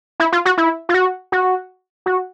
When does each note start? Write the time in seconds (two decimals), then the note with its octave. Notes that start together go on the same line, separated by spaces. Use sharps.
0.20 E4
0.32 F4
0.45 F#4
0.58 E4
0.89 F4
0.94 F#4
1.32 F#4
2.06 F#4